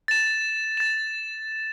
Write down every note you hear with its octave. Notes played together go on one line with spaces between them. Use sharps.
A6 E7
A6 E7